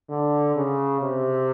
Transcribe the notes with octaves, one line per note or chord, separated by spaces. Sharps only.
D3
C#3
C3